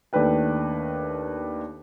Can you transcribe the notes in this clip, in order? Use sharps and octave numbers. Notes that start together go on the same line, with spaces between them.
D#2 A3 D4 B4 G5